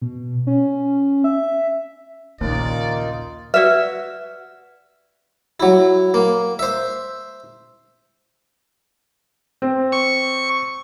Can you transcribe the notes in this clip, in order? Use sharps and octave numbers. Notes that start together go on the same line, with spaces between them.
B2
C#4
E5
A#1 D#2 C#3 A#3 D#4 F4 D5
F#4 B4 D5 E5
F#3 E4
A#3
C5 E5
C4
C#6